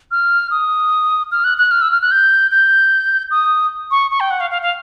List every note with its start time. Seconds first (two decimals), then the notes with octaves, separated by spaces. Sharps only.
0.11 F6
0.51 D#6
1.32 F6
1.44 F#6
1.58 F#6
1.71 F6
1.82 E6
1.92 F6
2.02 F#6
2.11 G6
2.51 G6
3.31 D#6
3.91 C#6
4.11 C#6
4.20 G5
4.31 F#5
4.40 F5
4.51 F5
4.62 F5